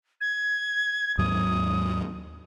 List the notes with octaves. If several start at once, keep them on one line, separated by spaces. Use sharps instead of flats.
G#6
D#2 G#2 F#3 D#6